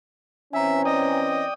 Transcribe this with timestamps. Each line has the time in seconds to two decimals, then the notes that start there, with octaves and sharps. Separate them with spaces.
0.53 E3 C4 C#4 E5 G#5 A#5
0.85 D5 D#5 G5 D#6